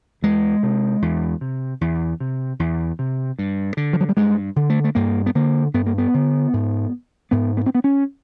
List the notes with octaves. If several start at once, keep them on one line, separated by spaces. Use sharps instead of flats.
E2 G#3
C3
E2
C3
E2
C3
E2
C3
G2
D3
F3
F#3
G3
G2 G#3
D3
A3
A3
G2 A#3
B3
D3 A#3
G2 B3
A#3
B3
D3
G#2
G#2 B3
B3
C4
B3
C#4